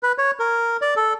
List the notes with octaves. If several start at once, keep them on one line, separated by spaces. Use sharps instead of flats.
B4
C#5
A#4
D5
A4